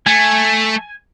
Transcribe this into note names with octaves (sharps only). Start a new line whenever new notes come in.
A3 G#5